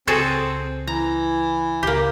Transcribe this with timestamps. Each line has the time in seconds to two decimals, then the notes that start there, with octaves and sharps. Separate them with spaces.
0.07 C#2 C4 F#4 G#4 A4
0.87 E3 A#5
1.83 C#2 A#3 G4